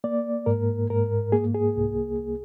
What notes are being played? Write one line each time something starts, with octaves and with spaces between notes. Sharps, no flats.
A#3 D5
G#2 A#4
G#2 A#4
A#3 G#4
G#4
C2
C2